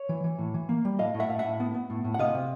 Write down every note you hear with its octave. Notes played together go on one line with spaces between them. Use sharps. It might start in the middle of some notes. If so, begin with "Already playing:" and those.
Already playing: C#5
E3
E3
A2
E3
A#3
G3
A2 D#5 F5
A2
E5 F#5
A2 F5
A2 E5 F#5
B3
B3
A2
A2
F#5
C3 D#5 F5
C3